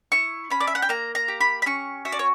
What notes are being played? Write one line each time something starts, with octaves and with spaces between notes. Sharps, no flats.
E4 C#6
C#4 B5
D5
E5
F#5
G5
A#3 A#5
A#5
G4
B5
B5
C#4 C#6
F#4 E5
D5
C#5